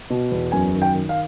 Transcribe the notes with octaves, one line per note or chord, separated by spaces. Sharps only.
B2
E2
F#2 G#5
D#3
G5
D#3
F5